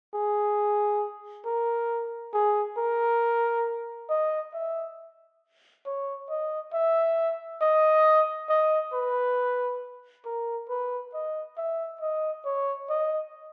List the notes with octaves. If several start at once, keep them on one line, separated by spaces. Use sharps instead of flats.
G#4
A#4
G#4
A#4
D#5
E5
C#5
D#5
E5
D#5
D#5
B4
A#4
B4
D#5
E5
D#5
C#5
D#5